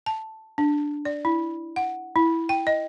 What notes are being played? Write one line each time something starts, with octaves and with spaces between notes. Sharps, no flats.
A5
D4
D5
E4
F#5
E4
G5
D#5